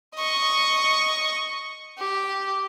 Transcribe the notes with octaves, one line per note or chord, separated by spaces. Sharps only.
D#5 C#6
G4